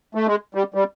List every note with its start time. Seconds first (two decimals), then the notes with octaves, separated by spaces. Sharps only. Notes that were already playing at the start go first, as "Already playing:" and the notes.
0.15 A3
0.27 G#3
0.55 G3
0.74 G3